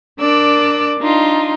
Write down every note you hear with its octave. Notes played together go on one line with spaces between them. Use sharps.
D4 A#4 D5 D6 E6 F#6
D4 D#4 F4 C6